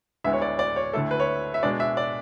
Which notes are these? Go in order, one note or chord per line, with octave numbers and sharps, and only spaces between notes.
D2 D3 G#3 B3 E4 E5
C#5
D5
D5
C#5
D2 D3 A3 E4 A4
B4
C#5
E5
B2 G#3 D4 D5
E5
D5